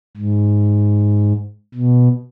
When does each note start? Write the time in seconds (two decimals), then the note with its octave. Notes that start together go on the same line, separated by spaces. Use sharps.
0.17 G#2
1.74 B2